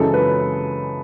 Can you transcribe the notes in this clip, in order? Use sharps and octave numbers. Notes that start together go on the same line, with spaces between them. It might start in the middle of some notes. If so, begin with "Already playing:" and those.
Already playing: F#2 C#3 E3 G#3 A4
B4